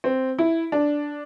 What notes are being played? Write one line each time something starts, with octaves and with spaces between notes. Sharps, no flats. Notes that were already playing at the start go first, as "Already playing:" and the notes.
C4
E4
D4